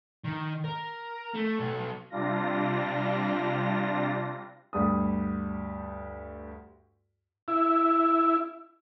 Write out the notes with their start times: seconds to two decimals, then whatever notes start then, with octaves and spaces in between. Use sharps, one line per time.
0.24 D#3
0.64 A#4
1.34 A3
1.59 B1 A4
2.10 C3 G3 D4 F4 A#6
4.73 D2 G2 G3 D#6
7.48 E4